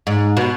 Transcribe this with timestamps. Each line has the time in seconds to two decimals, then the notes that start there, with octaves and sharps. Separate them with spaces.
0.07 G#2
0.37 B2